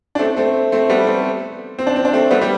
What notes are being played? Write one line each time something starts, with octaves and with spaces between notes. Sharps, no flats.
D4
A3 C4
A3 C4
A3 C4
G3 B3
A3 C4
C4
D4
C4
D4
A3 C4
G3 B3
G3